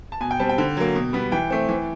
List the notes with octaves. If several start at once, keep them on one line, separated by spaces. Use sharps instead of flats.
A5
B2 G#5
G5
G3 C4 A5
G5
D3
F#3 A#3
B2
G3 B3
E3 G5
A3 C4
E3